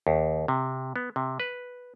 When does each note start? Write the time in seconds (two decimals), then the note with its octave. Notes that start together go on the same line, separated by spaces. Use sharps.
0.07 D#2
0.48 C3
0.96 B3
1.16 C3
1.40 B4